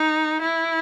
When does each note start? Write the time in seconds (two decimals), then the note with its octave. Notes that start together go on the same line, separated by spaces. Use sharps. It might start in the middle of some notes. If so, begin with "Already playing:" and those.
Already playing: D#4
0.42 E4